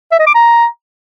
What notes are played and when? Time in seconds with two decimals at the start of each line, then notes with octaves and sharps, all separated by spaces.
0.12 E5
0.19 D#5
0.27 D6
0.34 A#5